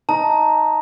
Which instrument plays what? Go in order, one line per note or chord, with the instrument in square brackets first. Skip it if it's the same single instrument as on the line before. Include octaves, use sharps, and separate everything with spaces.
[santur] D#4 [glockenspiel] A5